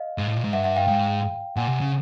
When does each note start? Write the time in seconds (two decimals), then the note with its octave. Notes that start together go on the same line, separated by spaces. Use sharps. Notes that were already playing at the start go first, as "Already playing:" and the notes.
Already playing: D#5 F5
0.18 G#2
0.27 A2
0.36 A#2
0.44 G#2
0.53 G2 E5 F#5
0.64 E5 F#5
0.76 F5 G5
0.87 G#2 F5 G5
1.56 A#2 F#5 G#5
1.68 C3
1.80 C#3